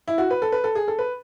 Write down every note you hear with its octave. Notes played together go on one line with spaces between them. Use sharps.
E4
F#4
B4
A4
B4
A4
G#4
A4
B4